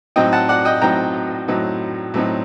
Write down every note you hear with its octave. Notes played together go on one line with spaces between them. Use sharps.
A2 F#3 C4 D#4 D#5 G5
F#5 A5
D5 F#5
D#5 G5
A2 F#3 C4 D#4 G5 A#5
A2 F#3 C4 D#4
A2 F#3 C4 D#4